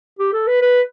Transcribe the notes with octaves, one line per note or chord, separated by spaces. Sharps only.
G4
A4
B4
B4